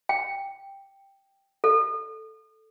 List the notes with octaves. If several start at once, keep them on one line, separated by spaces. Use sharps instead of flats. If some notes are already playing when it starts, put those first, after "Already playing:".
G5
A4